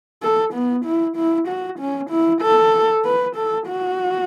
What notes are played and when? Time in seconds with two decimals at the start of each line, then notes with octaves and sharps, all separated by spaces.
0.23 A4
0.54 B3
0.85 E4
1.17 E4
1.48 F#4
1.79 C#4
2.10 E4
2.42 A4
3.05 B4
3.36 A4
3.67 F#4